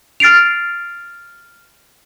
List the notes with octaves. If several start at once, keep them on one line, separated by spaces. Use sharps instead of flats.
F6 A6 C7 D7 F7